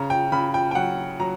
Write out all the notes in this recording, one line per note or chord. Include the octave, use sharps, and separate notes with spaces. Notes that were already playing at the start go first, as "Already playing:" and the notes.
Already playing: C#3 A#5
G5
C#3 B5
G5
G5
F#3 F#5
F#3 A#5